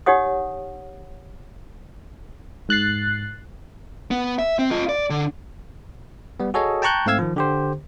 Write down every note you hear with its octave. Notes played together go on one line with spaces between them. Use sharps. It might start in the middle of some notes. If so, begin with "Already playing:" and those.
D#4 G4 C#5 F#5 D#6
G#2 F#6 A6 C7
B3
E5
C4
F4 D#5
D5
D3
G3 B3
F#4 G#4 A4 C#5 D#5
G5 A5 A#5 C#6 F#6 G6
G#2 A3 C4 F5 E6 G#6
D#3 F3
D3 G4 C5